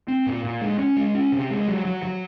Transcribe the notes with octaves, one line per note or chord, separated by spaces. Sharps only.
C4
A#2
A#2
G#3
C#4
G#3
C#4
C3
G#3
F#3
F#3
F#3